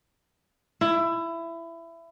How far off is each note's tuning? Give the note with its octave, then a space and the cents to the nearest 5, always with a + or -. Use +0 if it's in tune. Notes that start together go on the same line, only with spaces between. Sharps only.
E4 +20